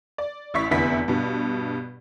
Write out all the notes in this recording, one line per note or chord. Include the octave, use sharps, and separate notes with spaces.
D5
A1 E4 C#6 B6
F1 E2 D3 B3 E4 B6
G2 B2